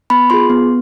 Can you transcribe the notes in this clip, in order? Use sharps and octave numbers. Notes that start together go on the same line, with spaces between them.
B3 B5
F4 G#4 C6
B3